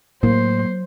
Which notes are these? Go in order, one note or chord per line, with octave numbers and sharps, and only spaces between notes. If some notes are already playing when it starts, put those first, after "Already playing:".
A2 F#3 A#3 C5